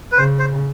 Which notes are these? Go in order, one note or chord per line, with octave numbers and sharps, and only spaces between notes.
B4
C#3 C5
C5